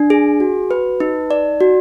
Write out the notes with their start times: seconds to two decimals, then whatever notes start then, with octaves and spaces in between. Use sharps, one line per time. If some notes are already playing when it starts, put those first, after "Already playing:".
Already playing: D4
0.10 G#4
0.40 F#4
0.71 B4
1.00 D#4
1.31 D5
1.61 F#4